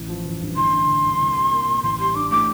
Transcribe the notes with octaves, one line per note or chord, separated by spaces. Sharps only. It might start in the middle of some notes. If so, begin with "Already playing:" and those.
Already playing: A1
F3
A1
G2
A1 C6
D3
A1
G2
C2
G3
A#3
A#2
A1 C6
G3 C6
D4 D6
A2 D6